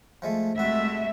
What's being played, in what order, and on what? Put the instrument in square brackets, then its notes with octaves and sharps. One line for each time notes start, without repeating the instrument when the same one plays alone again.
[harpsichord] F3 G#3 A3
[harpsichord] C2 F#4 [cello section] G#3 A3 E5